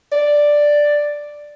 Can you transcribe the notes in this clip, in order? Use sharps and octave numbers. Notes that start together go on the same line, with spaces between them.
D5